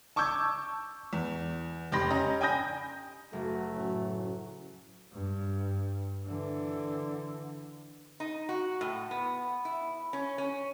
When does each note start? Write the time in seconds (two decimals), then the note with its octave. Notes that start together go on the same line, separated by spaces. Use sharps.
0.16 A5 C#6 D6 E6 G6 G#6
1.13 E2
1.92 F1 G4 B5 C6 A#6
2.11 C#4 D#5 A#5
2.41 G5 G#5 B5 D#6 G6 A#6
3.33 F#1 A3 F#4 A#6
3.75 A2 F#3 C#4
5.12 G2
6.26 D3 E3
8.20 D#4
8.49 F#4
8.81 A2
9.11 B3
9.65 E4
10.13 C#4
10.38 C#4